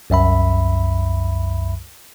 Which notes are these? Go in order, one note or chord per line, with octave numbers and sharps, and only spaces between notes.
C2 F#2 E5 B5